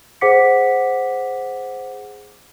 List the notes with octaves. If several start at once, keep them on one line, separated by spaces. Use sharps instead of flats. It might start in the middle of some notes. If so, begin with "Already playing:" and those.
G#4 C5 F#5 D6 B6 C#7